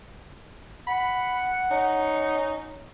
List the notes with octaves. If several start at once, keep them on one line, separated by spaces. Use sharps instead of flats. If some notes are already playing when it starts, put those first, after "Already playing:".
F#5 B5
C#4 D#4